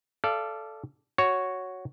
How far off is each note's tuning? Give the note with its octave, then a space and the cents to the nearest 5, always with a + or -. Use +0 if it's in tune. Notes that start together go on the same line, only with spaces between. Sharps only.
A4 -5 D5 +0 F5 -30
F#4 +0 C#5 +0